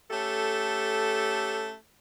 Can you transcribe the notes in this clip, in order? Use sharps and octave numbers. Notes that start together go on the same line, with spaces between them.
A3 C#4 G4 A4